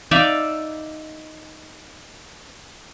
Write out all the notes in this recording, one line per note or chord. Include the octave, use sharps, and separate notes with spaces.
D#4 D5 E5 F5